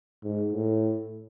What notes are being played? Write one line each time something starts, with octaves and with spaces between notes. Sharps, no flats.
G#2
A2